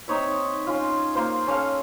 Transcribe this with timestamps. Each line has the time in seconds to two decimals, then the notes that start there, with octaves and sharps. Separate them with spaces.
0.08 C4 D#4 C#5 E5
0.67 C#4 F4
1.15 A#3 F4 C5
1.47 C#4 A4 F5